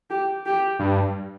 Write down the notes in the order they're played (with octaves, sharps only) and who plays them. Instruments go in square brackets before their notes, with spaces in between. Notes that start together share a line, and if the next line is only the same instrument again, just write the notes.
[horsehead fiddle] G4
G4
[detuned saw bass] G2